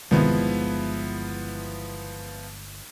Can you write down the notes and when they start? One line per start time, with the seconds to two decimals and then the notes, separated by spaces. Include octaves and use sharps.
0.11 G1 C2 D#3 F3 G#3 B3 E4